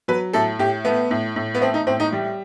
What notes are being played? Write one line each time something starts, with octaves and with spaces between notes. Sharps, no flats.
F#3 B4
A2 A4
A2 G4
A3 B3
A2
A2
B3
A3 C4
D#4
A2 C4
D#4
G3